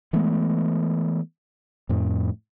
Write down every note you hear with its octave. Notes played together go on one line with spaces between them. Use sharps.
E3 G#3 A3 B3
F2 A2